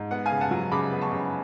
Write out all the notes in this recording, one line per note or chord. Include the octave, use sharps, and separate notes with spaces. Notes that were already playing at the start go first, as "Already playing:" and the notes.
Already playing: G#2
B3 F#5
F5 G#5
C#3
F#5 A5
F#3
C#3 B5 D6
B3
A5 C#6
C#3